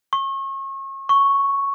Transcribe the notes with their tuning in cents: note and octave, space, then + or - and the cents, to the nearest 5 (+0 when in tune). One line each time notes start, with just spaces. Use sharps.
C#6 -35
C#6 +0